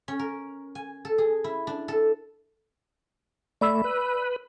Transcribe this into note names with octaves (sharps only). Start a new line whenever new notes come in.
C#4
A#4
G#5
A4
G#4
E4
D4
A4
A3 D5 B5 E6
B4